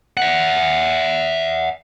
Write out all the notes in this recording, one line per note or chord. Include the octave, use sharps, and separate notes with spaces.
E5 F#5